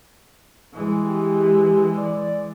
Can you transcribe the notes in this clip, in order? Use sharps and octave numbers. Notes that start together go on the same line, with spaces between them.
E3 G#3
G4
D5